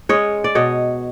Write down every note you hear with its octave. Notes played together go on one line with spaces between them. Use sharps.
G#3 C#4 C#5 D#5
D5
B2 C#5 D#5